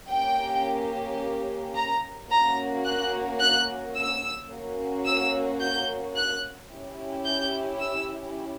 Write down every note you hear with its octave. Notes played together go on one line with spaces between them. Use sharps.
A#3 C#4 G4 G5
A#5
A#3 C#4 F#4 A#5
F#6
F#6
E6
A#3 C#4 F#4
E6
G6
F#6
C#4 E4 G4
G6
E6